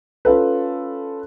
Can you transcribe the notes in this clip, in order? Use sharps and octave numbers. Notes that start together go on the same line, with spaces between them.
C#4 F4 A4 B4